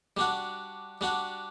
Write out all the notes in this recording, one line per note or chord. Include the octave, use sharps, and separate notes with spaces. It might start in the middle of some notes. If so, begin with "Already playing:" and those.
G3 D4 F#4
G3 D4 F#4